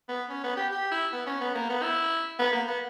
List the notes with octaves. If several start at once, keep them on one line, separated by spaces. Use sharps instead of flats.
B3
C#4
B3
G4
G4
E4
B3
C#4
B3
A#3
B3
E4
B3
A#3
B3